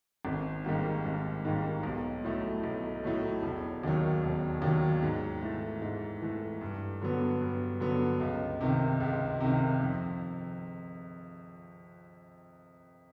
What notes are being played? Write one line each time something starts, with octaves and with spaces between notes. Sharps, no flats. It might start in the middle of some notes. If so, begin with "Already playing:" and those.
G#1
G#2 D#3 G3 A#3
G#1
G#2 D#3 G3 A#3
B1
A2 F#3 A3
B1
A2 F#3 A3
E1
D#2 D#3 F#3
E1
D#2 D#3 F#3
G#2
E3 A3
G#2
E3 A3
G2
D3 F#3 B3
G2
D3 F#3 B3
C#2
C3 D#3
C#2
C3 D#3
F2